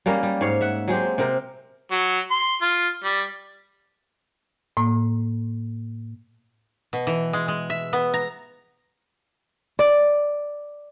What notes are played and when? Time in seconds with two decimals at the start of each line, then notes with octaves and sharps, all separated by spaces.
0.06 G3 A#3 C#4 A#4
0.23 G3
0.41 G#2 C#5 F5
0.61 E5 F#5
0.88 F#3 G#3 C4 G4
1.18 C3 C4 A#4
1.92 F#3
2.31 C6
2.62 F4
3.04 G3
4.77 A2 A#3
6.93 B2
7.07 E3
7.33 G#3
7.48 G#3
7.70 E5
7.93 B3
8.14 A#5
9.79 D5